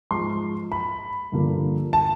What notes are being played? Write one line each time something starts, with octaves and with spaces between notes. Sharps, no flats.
G#2 F3 G#3 C6
B5
G2 D3 F3 A#3 D4
A5